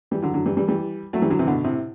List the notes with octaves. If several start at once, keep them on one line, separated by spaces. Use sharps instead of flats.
E3 G3
D3 F#3
D3 F#3
E3 G3
E3 G3
E3 G3
F#3 A3
E3 G3
D3 F#3
C3 E3
B2 D3
A2 C3